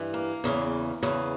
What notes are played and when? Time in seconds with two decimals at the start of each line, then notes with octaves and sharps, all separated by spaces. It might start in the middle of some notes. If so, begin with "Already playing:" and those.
Already playing: G2 E3
0.14 A#3
0.44 E2 C#3 E3
1.03 E2 C#3 E3